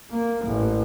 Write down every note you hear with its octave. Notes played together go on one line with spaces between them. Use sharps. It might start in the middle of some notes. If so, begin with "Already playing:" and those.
A#3
A1